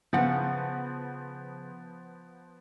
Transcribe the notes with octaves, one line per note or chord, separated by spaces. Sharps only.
C#3 F3 B3 F#5